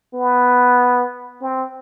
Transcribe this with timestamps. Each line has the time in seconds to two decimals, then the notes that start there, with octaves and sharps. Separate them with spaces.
0.14 B3
1.41 C4